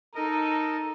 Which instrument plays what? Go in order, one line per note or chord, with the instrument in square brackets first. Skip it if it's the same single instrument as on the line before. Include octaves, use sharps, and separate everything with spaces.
[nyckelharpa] D#4 [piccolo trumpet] A4 [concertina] A#4 D#5 [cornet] A#5